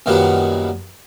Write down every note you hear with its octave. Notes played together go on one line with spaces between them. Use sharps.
F#2 A#2 D#3 F#3 G3 B3